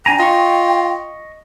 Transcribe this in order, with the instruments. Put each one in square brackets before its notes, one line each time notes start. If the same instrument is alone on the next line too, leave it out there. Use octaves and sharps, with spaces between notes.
[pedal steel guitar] D4 G#5 A#5 [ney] G5
[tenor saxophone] F4 [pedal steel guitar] D#5 C#6